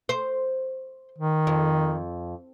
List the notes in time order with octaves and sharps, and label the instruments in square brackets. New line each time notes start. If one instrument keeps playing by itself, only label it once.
[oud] C5
[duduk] D#3
[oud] F2